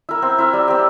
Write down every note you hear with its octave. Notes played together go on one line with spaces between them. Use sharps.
E4 A#4
C4
E4 A#4
G3
C4 G4